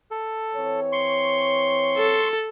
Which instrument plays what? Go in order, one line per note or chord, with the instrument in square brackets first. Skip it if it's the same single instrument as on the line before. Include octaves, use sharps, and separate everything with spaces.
[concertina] A4
[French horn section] E3 C4 C#5
[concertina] C6 C#6
[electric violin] A4